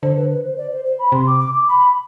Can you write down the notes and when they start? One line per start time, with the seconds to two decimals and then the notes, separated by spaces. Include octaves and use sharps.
0.03 D3 C5
0.16 B4
0.30 B4
0.44 C5
0.57 D5
0.71 C5
0.85 C5
0.99 B5
1.12 C3 C6
1.27 D6
1.40 D6
1.54 D6
1.68 B5